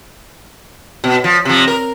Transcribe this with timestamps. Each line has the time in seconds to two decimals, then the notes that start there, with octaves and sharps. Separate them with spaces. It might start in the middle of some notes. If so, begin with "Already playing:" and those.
1.04 B2
1.24 F3
1.45 C3 F3
1.68 A#4